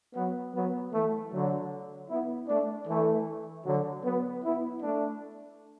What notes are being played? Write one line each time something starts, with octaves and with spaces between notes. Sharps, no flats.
F#3 B3
F#3 B3
E3 A3
D3 F#3
B3 E4
A3 D4
E3 A3
D3 F#3
F#3 B3
B3 E4
A3 D4